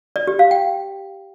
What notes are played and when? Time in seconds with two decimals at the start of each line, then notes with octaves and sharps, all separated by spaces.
0.16 D5
0.27 G4
0.39 F5
0.51 G5